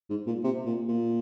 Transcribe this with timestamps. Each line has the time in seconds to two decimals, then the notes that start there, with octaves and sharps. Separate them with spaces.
0.10 G#2
0.27 A#2
0.44 C3
0.66 A#2
0.88 A#2